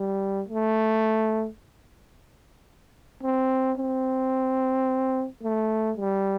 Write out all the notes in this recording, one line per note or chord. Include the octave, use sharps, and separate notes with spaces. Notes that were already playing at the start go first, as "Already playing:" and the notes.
Already playing: G3
A3
C4
C4
A3
G3